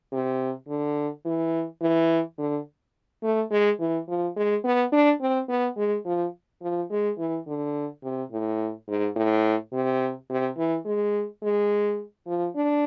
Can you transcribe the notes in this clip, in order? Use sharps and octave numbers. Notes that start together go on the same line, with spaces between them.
C3
D3
E3
E3
D3
A3
G#3
E3
F3
G#3
B3
D4
C4
B3
G#3
F3
F3
G#3
E3
D3
C3
A2
G#2
A2
C3
C3
E3
G#3
G#3
F3
D4